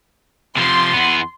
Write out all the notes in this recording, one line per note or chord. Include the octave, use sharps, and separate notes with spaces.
C3 F3 C6
E2 B3